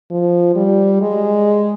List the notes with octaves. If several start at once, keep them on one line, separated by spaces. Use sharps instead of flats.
F3
G3
G#3